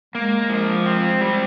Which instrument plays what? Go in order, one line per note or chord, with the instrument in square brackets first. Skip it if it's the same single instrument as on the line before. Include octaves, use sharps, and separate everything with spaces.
[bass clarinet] G#3 [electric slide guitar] A#3
[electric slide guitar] F3
C4
G3